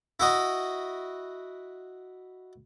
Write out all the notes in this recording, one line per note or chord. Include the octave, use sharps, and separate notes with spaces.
E4 F#4 D#5